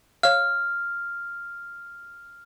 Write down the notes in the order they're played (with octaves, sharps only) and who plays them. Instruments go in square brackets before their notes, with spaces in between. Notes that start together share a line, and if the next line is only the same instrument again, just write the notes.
[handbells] C#5 F5 [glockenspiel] F6